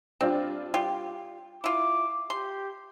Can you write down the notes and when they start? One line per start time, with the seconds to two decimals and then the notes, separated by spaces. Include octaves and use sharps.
0.21 G3 C4 D4 F4
0.74 F4 G4 G5
1.64 E4 F4 D6
2.30 G4 C6